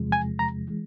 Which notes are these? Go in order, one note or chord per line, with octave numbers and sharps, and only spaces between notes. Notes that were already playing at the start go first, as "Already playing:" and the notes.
Already playing: E2 C3 F3 G#3
G#5
A#5
E3 G#3